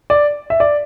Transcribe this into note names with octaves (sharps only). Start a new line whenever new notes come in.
D5
E5
D5